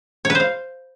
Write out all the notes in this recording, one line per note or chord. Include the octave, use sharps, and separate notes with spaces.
C#5
B4
C5
F5